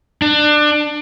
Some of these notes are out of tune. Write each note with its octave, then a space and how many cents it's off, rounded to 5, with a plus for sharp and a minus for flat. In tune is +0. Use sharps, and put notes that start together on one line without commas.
D4 +25